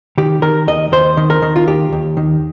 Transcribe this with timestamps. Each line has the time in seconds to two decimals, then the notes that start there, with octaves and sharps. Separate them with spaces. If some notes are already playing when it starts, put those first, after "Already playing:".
0.18 D#3 G4
0.42 D#3 A#4
0.68 D#2 D#5
0.92 D#2 C5
1.17 D#3
1.30 A#4
1.42 D#3
1.56 F4
1.67 D#2 G4
1.93 D#2
2.17 D#3